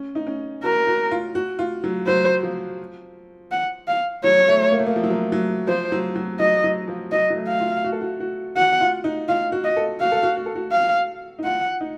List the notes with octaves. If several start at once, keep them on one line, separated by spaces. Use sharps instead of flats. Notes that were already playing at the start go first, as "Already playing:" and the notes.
Already playing: C#4
D#4
C#4
F#4 A#4
F#4
F4
F#4
F4
F#3
F#3 C5
F3
F#5
F5
F#3 C#5
A3
A#3
A3
A#3
F3
F#3
F3
F#3
F3 C5
F#3
F#3
F#3 D#5
F#3
F3
F#3 D#5
F#3
A3
F5
F4
F#4
A4
F#4
F#4
F#4 F#5
F4
D#4
F4 F5
F#4
D#5
A4
F#4 F5
A4
F#4
F#4
A4
F#4
F5
D#4
F4 F#5
D#4